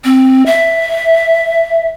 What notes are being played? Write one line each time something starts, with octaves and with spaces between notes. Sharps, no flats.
C4
E5